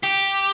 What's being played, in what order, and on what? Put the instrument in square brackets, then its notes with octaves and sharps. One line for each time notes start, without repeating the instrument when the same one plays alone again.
[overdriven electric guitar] G4